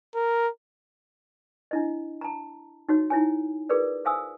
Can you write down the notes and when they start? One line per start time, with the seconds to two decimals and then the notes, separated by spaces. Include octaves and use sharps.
0.15 A#4
1.71 D4 E4 D#5
2.21 A5 A#5
2.89 D#4 F#4 C#5
3.10 D#4 E4 C#5 G#5
3.69 F4 G#4 A#4 B4 D5
4.05 A4 C5 F5 G#5 D#6 E6